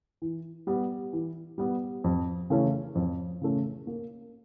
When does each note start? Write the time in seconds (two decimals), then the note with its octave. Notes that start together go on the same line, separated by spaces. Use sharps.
0.22 E3
0.67 G3 B3
1.13 E3
1.58 G3 B3
2.04 F2
2.50 C#3 E3 A3 C#4
2.95 F2
3.41 C#3 E3 A3 C#4
3.87 A#3